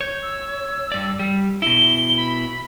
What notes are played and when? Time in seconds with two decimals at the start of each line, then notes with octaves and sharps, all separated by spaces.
0.01 C#5 G6
0.22 E6
0.92 G2 D5
1.19 G3
1.62 B2 E4 G7
2.17 B5